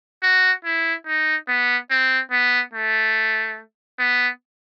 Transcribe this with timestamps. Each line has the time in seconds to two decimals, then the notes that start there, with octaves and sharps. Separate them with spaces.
0.23 F#4
0.65 E4
1.07 D#4
1.48 B3
1.90 C4
2.31 B3
2.74 A3
3.99 B3